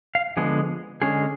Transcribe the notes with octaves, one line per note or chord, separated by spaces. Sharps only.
F5
D3 F3 G#3 B3 G#4
D3 G#3 C#4 G#4